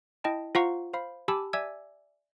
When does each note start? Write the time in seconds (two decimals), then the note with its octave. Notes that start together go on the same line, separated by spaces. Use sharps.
0.24 E4 D#5 G5 A5
0.55 F4 C5 F5 F#5 A#5 C#6
0.93 C5 F5 B5
1.28 G4 G#5 A5 B5 D6 E6
1.53 D5 E5 G#5 D6 E6 G#6